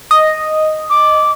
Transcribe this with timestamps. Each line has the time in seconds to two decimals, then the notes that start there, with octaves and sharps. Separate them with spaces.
0.11 D#5
0.90 D6